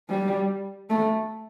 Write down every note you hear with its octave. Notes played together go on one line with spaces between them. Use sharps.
G3
A3